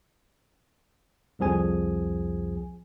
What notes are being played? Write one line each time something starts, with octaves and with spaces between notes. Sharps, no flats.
C2 F2 F3 G#4 G#5